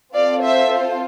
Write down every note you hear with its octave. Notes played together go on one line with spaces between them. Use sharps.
C4 F4 A4 D5 F5
C5 E5
C5